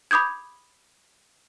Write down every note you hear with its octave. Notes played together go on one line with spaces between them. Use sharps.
B5 D6 D#6 G6 G#6